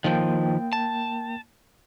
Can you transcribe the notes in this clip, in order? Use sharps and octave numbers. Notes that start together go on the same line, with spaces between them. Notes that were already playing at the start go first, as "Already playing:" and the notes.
D#3 F3 A#3 G5
A5